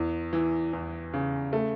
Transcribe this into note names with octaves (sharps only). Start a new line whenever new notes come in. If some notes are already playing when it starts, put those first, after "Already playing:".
Already playing: E2
E3
E2
C#3
A3